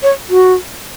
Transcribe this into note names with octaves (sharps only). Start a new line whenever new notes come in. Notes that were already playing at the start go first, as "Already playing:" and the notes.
C#5
F#4